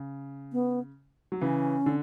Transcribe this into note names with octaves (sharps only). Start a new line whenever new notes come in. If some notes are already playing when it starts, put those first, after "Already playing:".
Already playing: C#3
B3
F#3
C#3 E3 C#4
D3